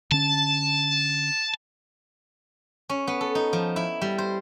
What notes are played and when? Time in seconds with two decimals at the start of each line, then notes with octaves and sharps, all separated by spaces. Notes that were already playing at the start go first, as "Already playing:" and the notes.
0.11 D3 C#4 A5
2.89 C#4
3.07 B3
3.21 A4
3.35 D#4
3.53 F3
3.76 E4
4.01 G3
4.18 C5